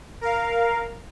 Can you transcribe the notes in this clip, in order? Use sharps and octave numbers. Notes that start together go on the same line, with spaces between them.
A#4 F5